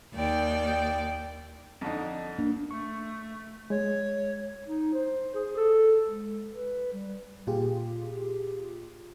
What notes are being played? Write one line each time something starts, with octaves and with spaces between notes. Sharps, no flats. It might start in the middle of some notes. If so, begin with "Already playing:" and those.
D#2 D5 G5
F2 D3 D#4
A#3 D4
A3 C#6
G#3 C#5
D#4
C5
G#4
A4
G#3
B4
G3
A#2 F4 G4 G#4